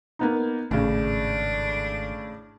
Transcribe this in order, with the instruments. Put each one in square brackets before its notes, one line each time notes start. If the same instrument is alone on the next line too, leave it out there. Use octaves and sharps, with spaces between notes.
[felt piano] A#3 B3 D#4
[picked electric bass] G#1 [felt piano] A2 C#3 [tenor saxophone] D4